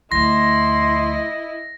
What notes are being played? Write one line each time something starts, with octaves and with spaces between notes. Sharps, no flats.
D2 F3 E4 D#5 C6 A#6